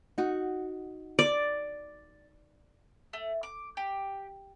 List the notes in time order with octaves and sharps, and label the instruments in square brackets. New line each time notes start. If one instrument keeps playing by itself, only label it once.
[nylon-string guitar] D#4 F#4
[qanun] D5
[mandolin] A3
D6
G4